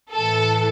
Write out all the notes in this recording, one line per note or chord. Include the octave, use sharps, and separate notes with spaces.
A2 E3 A4